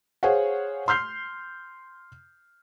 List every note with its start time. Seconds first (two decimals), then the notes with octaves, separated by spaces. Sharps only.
0.23 G#4 C5 C#5 F5 F#5
0.88 C6 F6 G6 C7